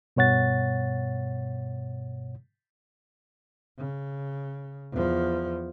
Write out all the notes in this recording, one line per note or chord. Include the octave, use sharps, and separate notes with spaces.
G2 B2 C#5 F#5 A6
C#3
E2 F3